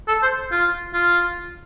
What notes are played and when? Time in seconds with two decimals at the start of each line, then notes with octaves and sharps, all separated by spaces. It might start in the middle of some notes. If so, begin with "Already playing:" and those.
0.08 A4
0.23 C5
0.52 F4
0.94 F4